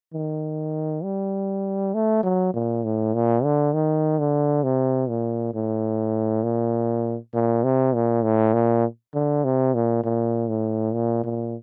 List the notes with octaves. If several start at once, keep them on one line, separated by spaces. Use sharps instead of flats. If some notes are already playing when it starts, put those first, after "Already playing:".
D#3
G3
A3
F#3
A#2
A2
A#2
D3
D#3
D3
C3
A#2
A2
A#2
A#2
C3
A#2
A2
A#2
D3
C3
A#2
A#2
A2
A#2
A#2